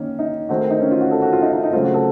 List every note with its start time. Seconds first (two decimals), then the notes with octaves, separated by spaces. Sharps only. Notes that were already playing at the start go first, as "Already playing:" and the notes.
Already playing: D#3 A#3 C#4 D#4
0.19 D#4
0.49 D#3 A3 C4 F#4
0.60 A#4
0.70 D#4
0.80 C#4
0.91 F4
1.01 F#4
1.11 A4
1.22 F#4
1.33 F4
1.42 D#4
1.53 D#4
1.63 D#4
1.73 C#3 F#3 A3 C4 F4
1.84 F#4
1.94 A4